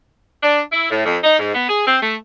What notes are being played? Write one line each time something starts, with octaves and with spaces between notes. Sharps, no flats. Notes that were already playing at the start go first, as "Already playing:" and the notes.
D4
E4
A2
F2
D#4
G#2
B3
G#4
C4
A3